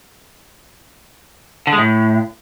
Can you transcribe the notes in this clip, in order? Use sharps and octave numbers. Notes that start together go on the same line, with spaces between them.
D3
G#3
A2